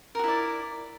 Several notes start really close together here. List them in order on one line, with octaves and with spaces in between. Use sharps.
A#4 F#4 E4 D5